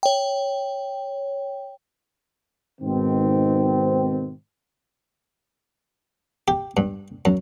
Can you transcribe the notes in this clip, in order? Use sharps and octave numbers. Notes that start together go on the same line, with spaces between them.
C#5 G5
G#2 B2 D#3 C4
G4
G2
F#2